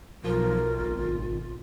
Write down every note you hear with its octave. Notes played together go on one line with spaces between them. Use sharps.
B1 F3 F4 A#4
G#1